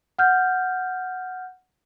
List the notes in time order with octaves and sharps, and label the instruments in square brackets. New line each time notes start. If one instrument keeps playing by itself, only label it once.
[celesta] F#5 F6 G6